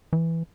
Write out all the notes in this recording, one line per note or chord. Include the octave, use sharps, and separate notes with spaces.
E3